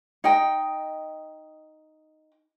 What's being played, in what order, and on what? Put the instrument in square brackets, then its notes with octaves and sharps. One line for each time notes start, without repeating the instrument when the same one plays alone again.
[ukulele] D#4 D#5 G5